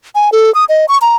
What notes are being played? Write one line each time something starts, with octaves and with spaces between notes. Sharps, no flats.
G#5
A4
D#6
D#5
C#6
A#5